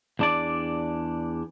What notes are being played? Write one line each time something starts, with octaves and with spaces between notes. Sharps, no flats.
E2 D4 D5